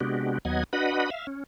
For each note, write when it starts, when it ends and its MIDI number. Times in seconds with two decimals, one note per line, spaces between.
0.01 0.38 48
0.01 0.38 56
0.01 0.38 59
0.01 0.38 62
0.01 0.38 66
0.01 0.38 67
0.45 0.64 39
0.45 0.64 54
0.45 0.64 59
0.45 0.64 75
0.45 0.64 78
0.45 0.64 92
0.73 1.10 62
0.73 1.10 66
0.73 1.10 71
0.73 1.10 75
0.73 1.10 78
0.73 1.10 83
1.10 1.27 76
1.10 1.27 77
1.27 1.44 61